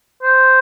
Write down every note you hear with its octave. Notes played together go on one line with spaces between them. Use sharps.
C5